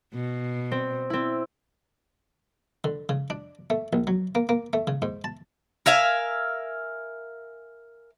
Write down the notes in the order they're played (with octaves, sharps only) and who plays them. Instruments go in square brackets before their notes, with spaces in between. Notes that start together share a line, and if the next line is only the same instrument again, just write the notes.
[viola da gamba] B2
[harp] C4
C4 E4
[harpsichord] D3
C#3
D4
A3
A#1
F#3
A#3
A#3
A3
C#3
G#2
A5
[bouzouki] A#4 E5 F5 G#5